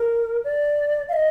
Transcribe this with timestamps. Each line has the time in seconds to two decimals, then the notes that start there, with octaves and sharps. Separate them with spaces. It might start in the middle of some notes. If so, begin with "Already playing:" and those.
Already playing: A#4
0.44 D5
1.09 F5
1.13 D#5